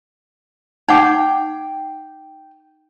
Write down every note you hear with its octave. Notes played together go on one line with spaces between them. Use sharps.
D#4 F#5 G5 D6